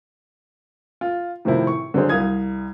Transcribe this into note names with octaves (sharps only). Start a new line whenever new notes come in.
F4
A2 C3 D#3 F3 C4 E4
C#6
D3 F#3 C4 G#4 C5
C2 F5 D#6 G#6